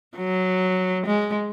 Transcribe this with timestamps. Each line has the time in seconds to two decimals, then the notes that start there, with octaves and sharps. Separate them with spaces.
0.16 F#3
1.06 G#3